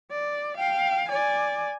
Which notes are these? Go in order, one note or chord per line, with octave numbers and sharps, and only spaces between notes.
D5
F5 G5
D5 G#5